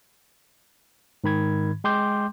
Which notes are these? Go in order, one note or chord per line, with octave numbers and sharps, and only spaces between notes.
G#2 D#3 B5 G#6
G#3 G5 C6 D6 G6